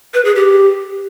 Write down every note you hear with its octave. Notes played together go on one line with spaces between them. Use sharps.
B4
G#4
G4